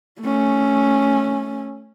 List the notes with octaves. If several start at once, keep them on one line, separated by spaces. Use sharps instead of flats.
A3 C#4